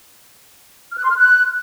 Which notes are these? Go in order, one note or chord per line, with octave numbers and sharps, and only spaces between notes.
F6
F#6
C6
F6
F#6